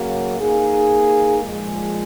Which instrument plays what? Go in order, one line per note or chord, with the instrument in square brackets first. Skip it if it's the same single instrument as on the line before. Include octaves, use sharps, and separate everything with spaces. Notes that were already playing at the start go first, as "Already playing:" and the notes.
Already playing: [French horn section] C#3 F#3 A#3
A#3 D#4 G#4
A#2 F3 G#3